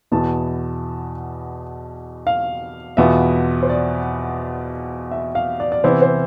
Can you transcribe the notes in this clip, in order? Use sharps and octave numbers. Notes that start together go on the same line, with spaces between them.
E2 B2 B3 E4 A5
F5
E2 B2 B3 F4 E5
C5
D5
E5
F5
D5
D5
C3 E3 B3 E4 C5
C5